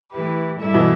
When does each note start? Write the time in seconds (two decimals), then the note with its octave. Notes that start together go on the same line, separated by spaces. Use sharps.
0.10 E3 A3 E4 G4 B4
0.58 G2 G3 E4 A4 E5
0.74 B2 E3